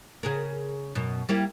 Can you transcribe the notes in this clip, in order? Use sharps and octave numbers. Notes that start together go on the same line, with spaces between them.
C#3 G#4 A#4
F#2 B2
G3 A#3 E4